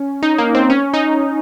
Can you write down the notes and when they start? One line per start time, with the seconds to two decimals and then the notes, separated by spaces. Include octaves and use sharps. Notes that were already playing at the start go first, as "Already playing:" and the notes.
Already playing: C#4
0.23 D#4
0.38 A#3
0.55 C4
0.70 C#4
0.94 D#4